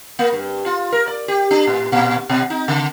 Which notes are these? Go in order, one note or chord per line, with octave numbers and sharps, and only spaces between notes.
A#3
G2
F4
A#4
D5
G4
D4
A2
A#2
B2
D#4
C#3